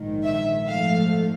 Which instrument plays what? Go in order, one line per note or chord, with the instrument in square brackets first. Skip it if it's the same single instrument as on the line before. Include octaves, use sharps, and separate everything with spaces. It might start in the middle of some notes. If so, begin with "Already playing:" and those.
Already playing: [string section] A#1 G#2 D#3
E5
G#2 F3 A3 F5